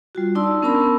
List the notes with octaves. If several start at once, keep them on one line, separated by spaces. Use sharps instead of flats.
G3 F4 F#4
D4 D#4 D5 A5 C6 E6
B3 C#4 A#4 A5 B5 E6